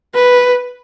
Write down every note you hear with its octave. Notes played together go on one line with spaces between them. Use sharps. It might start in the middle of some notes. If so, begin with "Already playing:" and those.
B4